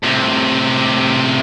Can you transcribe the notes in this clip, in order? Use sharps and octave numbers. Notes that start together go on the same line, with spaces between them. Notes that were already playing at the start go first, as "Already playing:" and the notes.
A2 C3